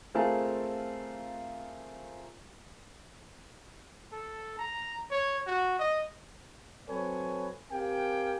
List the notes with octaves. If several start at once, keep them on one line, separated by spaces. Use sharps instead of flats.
A3 C4 F4 G#4 A#4 A5
A4
A#5
C#5
F#4
D#5
F#3 C4 A4 B4 C#5 G#5
C4 G4 A#4 F5 G5 G#5